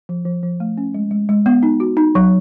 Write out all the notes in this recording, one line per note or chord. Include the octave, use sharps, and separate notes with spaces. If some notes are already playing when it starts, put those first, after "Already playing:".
F3
F3
F3
A3
C#4
G#3
G#3
G#3
B3
D#4
F#4
D#4
F#3